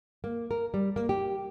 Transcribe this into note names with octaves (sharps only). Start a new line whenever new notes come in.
A#3
A#4
G3
A#3
G4